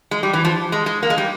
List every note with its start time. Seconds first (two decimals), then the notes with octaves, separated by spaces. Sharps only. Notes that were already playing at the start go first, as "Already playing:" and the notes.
0.11 G#3
0.23 G3
0.33 E3
0.45 F3
0.72 G#3
0.86 G#3
1.03 A#3
1.10 G#3
1.18 G3